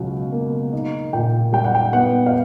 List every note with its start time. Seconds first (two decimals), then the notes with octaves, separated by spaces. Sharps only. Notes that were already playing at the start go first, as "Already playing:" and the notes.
Already playing: C#2 B2 F#3
0.32 A#3
0.73 D#4
1.13 A#2 G5
1.52 G3 G5
1.64 F#5
1.75 G5
1.93 B3 F#5
2.26 F5